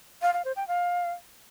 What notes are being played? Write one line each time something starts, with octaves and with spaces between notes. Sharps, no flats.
F5
F5
C5
G5
F5